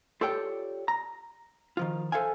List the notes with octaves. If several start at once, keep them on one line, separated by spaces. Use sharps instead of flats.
F4 G4 A4 C#5 D5 G5
A#5
D#3 F3 F4
A4 C5 E5 F5 G#5